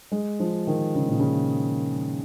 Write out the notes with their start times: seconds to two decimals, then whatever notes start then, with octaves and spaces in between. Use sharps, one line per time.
0.12 G#3
0.40 F3
0.67 D#3
0.95 C#3
1.08 A#2
1.20 C#3